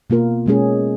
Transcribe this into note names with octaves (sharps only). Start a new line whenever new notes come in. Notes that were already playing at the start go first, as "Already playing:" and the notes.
B2 A#3 F4 A#4
B2 G#3 C#4 G#4